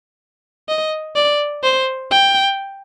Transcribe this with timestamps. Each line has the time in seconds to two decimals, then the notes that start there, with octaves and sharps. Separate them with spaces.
0.69 D#5
1.16 D5
1.63 C5
2.11 G5